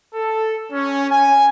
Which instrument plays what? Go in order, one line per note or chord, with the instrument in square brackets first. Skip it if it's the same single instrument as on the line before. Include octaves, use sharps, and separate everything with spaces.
[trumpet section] A4
C#4
G#5